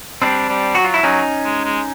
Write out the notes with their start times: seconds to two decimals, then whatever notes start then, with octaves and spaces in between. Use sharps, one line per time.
0.22 G3 C4 D4
0.49 G3
0.75 F#3 F#4
0.84 F4
0.94 E4
1.03 F#3 C#4 D#4
1.44 G#3
1.64 G#3